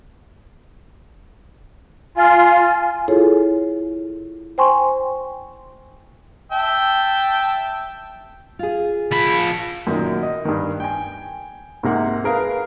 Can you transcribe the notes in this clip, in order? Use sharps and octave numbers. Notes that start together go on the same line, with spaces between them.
F4 G#5
E4 F4 G#4 A4 C#5
C5 G5 G#5 C6 C#6
E5 G5 A5
F4 G#4
F3 B5
F#2 A#2 D#3
D#5
G2 D#3
G5 G#5
G#2 C3 A#3 F#5
G#4 A#4 B4 F5